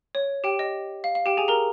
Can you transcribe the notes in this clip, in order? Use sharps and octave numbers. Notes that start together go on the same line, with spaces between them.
C#5
G4 G5
D#5
F5
F5
G4 G5
G#4 G#5
A#4 A#5